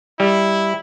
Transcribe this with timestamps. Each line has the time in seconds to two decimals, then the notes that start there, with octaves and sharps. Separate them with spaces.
0.20 G3 E4